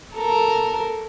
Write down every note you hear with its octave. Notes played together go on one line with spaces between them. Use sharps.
A4 A#4